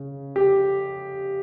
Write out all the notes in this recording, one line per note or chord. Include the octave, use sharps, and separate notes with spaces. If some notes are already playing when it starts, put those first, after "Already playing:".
Already playing: C#3
G4